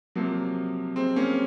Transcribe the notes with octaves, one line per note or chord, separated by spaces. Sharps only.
C3 F3 F#3 A#3
G#3 C4
A#3 C#4